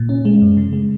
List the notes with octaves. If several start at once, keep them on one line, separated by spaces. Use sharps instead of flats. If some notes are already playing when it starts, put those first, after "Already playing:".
Already playing: A#2
C#4
G#3
F#2
C#3
G#3